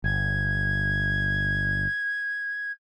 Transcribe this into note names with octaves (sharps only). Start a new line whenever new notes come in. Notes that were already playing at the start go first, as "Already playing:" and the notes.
G1 G#6